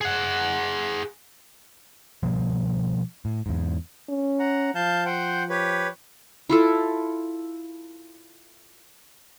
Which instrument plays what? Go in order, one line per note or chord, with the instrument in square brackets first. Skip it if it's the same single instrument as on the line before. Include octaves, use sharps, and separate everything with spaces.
[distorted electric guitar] G#4 F#5
[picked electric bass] B2 F3 G3 A#3
A2
E2 G#2
[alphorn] C#4
[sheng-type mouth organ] F#5 A#5
[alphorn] F3 [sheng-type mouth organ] F5 A5 G6
[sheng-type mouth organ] C5 F#5 G5
G4 B4 C#5
[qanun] E4 F4 A4